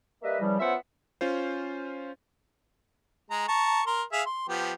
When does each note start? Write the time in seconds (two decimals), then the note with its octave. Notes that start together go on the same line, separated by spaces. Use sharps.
0.23 G3 A#3 B4 D#5 E5
0.40 C#3 E3 F3 G3
0.59 B3 C#4 F4 C5 E5 F#5
1.21 C#4 F4 C5
3.31 G#3 A#5
3.48 A5 A#5 C#6
3.87 A#4 C6
4.12 G#4 E5 F5
4.26 C6
4.49 F3 B3 G4